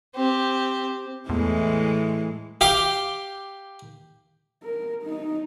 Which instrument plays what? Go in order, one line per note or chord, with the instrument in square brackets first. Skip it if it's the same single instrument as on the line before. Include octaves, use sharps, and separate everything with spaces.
[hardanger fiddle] C4 G4
[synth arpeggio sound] E2 [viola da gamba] A2 E3 G#3
[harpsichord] G4 F5 G5 D6
[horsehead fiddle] A#4
D#4